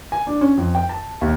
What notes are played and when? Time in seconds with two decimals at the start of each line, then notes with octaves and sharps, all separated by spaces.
0.12 G#5
0.27 D4
0.41 C#4
0.57 F2
0.75 G5
0.89 A5
1.21 D#2